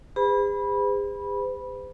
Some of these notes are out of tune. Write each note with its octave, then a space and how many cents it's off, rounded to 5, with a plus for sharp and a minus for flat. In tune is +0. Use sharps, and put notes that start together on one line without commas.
G#4 -45 C5 -45 B5 -15